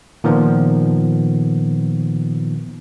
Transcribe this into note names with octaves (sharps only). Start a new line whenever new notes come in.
A#2 D#3 F3 B3